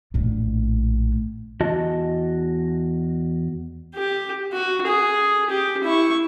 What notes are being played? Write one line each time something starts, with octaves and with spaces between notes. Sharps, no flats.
A#1 A2
E2 F#4 D#5 A5
G4
F#4
G#4
G4
E4 C#6